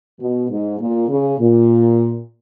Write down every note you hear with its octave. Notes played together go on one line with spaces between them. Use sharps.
B2
G#2
A#2
C#3
A#2